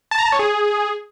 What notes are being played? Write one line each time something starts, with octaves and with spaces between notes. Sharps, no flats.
A5
A#5
A5
C#5
G#4